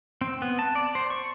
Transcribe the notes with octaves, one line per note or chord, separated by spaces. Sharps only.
C4
B3
A5
D5
C5
C#6